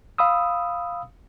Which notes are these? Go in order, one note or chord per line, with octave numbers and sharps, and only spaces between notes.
F5 B5 D#6 E6